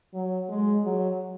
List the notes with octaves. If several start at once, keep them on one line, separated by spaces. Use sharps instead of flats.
F#3
G#3
F#3